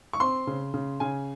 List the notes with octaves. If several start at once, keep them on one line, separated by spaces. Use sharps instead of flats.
C#6
C4 C6
C#3
C#3
C#3 G#5